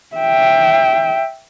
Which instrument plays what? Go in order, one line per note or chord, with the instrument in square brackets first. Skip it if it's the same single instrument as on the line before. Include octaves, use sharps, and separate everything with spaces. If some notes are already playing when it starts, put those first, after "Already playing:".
[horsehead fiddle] E5 G5